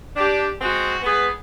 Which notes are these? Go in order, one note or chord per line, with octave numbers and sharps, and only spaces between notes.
D4 G4
G#3 C4 F#4
G#3 B3 G#4 B4